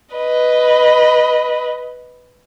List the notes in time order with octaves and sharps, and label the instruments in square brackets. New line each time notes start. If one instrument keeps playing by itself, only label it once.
[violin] B4 D#5